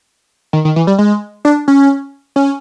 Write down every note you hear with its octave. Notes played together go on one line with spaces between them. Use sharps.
D#3
D#3
E3
G3
G#3
D4
C#4
C#4